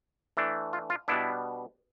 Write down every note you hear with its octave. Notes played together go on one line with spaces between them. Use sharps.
E3 A3 D4
F4
F4
B2 G3 B3 D4 E4